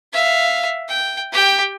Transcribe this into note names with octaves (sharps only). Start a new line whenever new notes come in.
E5 F5
G5
G4 G5